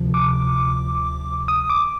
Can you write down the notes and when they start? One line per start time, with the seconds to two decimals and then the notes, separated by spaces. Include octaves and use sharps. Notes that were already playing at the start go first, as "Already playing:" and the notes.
Already playing: D2 C3 F3
0.14 D6
1.48 D#6
1.70 D6